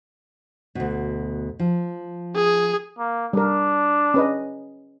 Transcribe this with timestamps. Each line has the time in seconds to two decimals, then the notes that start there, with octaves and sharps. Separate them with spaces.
0.75 D2 B2
1.59 F3
2.36 G#4
2.99 A#3
3.33 G3 D4 A#4
4.14 C#4 B4 D#5